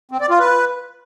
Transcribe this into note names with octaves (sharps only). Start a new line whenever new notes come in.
C4
D5
F4
B4